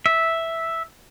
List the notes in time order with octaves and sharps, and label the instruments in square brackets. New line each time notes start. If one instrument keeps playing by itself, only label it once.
[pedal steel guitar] E5